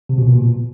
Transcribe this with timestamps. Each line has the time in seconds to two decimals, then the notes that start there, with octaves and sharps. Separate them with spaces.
0.09 C3
0.18 B2
0.27 A#2
0.35 B2